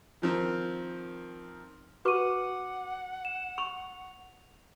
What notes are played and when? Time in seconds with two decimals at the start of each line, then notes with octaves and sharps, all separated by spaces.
0.22 D#3 F3 C4 A#4
2.05 F#4 B4 F#5 C#6 D6 D#7
3.25 E7
3.58 C#6 F7